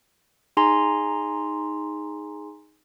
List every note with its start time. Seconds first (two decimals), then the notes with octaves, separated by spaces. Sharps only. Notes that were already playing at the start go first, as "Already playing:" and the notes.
0.57 D#4 G#4 G#5 A#5 C6